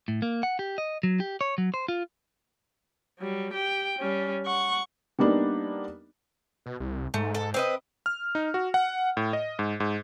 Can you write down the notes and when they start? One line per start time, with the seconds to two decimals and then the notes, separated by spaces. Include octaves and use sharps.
0.08 A2
0.22 A#3
0.43 F#5
0.59 G4
0.78 D#5
1.03 F#3
1.20 G4
1.41 C#5
1.58 F#3
1.74 C5
1.88 F4
3.19 F#3 G3
3.53 G4 G5
3.98 G3 C#4
4.46 F#5 C#6
5.19 G3 A#3 B3 D4 D#4
6.66 B2
6.80 C2
7.14 G#2 A3
7.35 A4
7.54 C4 B4 D#5
8.06 F6
8.35 D#4
8.54 F#4
8.74 F#5
9.17 A2
9.33 D#5
9.59 G#2
9.80 G#2